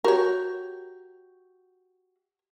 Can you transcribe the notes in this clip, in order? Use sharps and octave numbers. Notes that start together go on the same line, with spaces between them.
F#4 G4 A#4 C#5